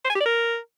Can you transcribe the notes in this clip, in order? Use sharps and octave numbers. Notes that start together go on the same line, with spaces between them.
C5
G#5
G4
D5
A#4